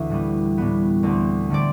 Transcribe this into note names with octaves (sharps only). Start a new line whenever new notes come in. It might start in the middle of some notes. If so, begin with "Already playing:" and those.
Already playing: D2 E3 A4 E5
A2 G3 B3
A2 G3 B3
D2 D3 A3 C4
D3 A3 C4 D5